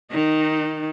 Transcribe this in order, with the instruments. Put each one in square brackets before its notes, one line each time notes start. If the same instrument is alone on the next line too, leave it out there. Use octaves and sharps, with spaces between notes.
[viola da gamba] D#3 [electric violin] D#4